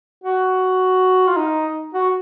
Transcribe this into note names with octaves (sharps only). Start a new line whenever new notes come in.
F#4
F4
D#4
F#4